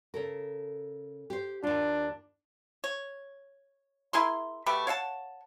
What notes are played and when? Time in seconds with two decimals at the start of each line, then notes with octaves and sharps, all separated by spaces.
0.14 C#3 A4 A#4
1.30 G4 C5
1.63 D#2 D4 F4
2.84 C#5
4.13 E4 G#4 A#4 C6
4.66 B2 A3 G4 B4
4.87 C#5 F5 F#5 A5